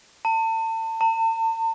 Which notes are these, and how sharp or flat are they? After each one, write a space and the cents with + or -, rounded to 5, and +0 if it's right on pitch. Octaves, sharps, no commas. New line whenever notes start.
A5 +35
A5 +45